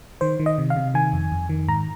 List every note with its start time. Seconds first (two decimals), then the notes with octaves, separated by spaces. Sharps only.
0.21 D#3 C5
0.40 D#3
0.46 D#5
0.58 C3
0.70 F5
0.76 C3
0.94 D#3 G#5
1.13 F2
1.32 F2
1.49 D#3
1.68 G#2 A#5